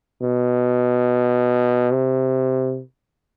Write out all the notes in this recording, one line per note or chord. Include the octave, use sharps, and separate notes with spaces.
B2
C3